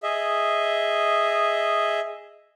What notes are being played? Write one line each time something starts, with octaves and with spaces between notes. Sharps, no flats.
G#4 D#5 E5